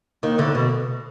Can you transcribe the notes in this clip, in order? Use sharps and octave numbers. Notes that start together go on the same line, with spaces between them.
D#2 D#3
D2 D3
B2